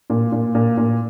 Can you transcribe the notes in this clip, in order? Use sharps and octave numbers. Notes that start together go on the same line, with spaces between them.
A#2
A#2
A#2
A#2